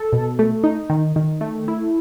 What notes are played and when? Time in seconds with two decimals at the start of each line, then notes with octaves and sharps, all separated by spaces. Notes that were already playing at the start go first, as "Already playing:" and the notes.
Already playing: A4
0.13 B2
0.39 A3
0.64 D#4
0.90 D#3
1.16 D#3
1.41 A3
1.68 E4